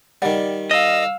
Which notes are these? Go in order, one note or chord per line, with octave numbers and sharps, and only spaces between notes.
D#3 G3 D5 F#5
D#5 F5 E6